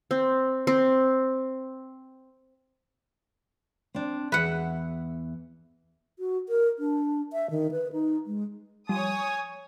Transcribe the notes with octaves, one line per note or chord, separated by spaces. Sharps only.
C4
C4
C4 D4
E2 B4 E5 F#5
F#4
A#4
D4
E5
D#3
B4
D#4
G#3
F3 G3 C#5 G#5 D#6